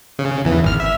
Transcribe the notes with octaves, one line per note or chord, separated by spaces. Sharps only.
C#3
E2 E3
G#1 F6
E5